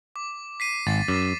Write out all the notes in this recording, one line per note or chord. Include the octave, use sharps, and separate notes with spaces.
D6
B6 C7 D#7
G#1 A6
F#2 D6